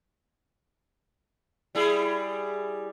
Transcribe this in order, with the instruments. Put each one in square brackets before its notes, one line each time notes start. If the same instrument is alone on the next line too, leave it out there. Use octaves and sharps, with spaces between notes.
[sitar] G3 E4 G#4